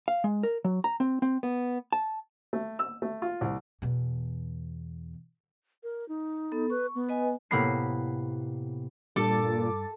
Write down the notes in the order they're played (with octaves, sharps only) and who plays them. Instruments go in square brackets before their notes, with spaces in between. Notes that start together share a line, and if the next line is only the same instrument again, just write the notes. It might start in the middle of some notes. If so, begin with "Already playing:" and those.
[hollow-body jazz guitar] F5
G#3
A#4
F#3
A#5
C4
C4
B3
A5
[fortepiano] A3
E6
A3
F4
C2
[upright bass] E2 B2
[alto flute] A#4
D#4
[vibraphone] B3 A4
[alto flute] B4 [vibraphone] C#6
[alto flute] B3
[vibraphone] B4 D#5 G#5
[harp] A2 C3 A#3 B3 B5 C7
[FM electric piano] G2 D6 A6 [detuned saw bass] A#2 [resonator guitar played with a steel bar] A4